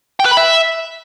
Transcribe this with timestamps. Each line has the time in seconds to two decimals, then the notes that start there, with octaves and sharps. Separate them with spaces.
0.20 G5
0.25 B4
0.31 B5
0.37 E5